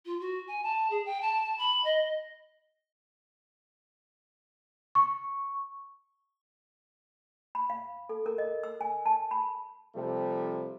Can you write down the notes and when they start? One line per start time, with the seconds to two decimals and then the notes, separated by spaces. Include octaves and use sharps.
0.06 F4
0.20 F#4
0.48 G#5
0.63 A5
0.90 G#4
1.05 G5
1.21 A5
1.59 B5
1.84 D#5
4.95 C#6
7.55 B5
7.70 F5
8.09 A4
8.26 A#4
8.38 D#5
8.64 E6
8.81 G#5
9.06 A5
9.31 B5
9.95 C3 F3 G3 A3